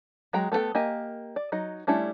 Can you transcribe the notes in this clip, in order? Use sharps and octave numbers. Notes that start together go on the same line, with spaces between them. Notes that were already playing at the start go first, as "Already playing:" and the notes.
F#3 G#3 G5 A#5
A3 B3 C4 A4 G5
A#3 G4 D#5 G#5
D5
F#3 D#4 D#5
G3 A3 C#4 D4 E4